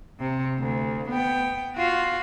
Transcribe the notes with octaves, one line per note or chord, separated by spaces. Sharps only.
C3
D2
B3 G5
F4 F#4